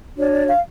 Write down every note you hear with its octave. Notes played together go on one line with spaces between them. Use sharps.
D4 F#4 C#5 D5
D5
F5